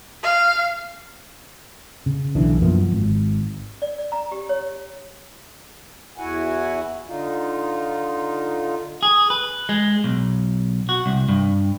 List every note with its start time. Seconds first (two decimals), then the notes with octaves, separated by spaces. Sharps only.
0.23 F5
2.06 C#3
2.35 B1 D3 E3 D4
2.61 F#2 F3 A#3 B3
2.91 G#1
3.82 D5
3.98 D5
4.12 A#5
4.32 G4
4.49 C#5
6.18 E2 E4 F#4 F#5 G#5
7.07 D3 D#4 F4
9.03 G#4
9.30 B4
9.69 G#3
10.04 B1
10.89 F#4
11.06 C2
11.29 G2